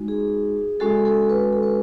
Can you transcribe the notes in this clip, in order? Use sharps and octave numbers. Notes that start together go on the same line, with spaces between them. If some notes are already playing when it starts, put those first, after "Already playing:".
Already playing: G#3 D#4 F#4
G#4
G#3 C#4 F#4 A4
A4
B4
A4
B4